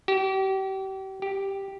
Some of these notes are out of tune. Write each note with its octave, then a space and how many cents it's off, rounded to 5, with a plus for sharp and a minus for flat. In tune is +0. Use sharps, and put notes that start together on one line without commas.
G4 -35
G4 +0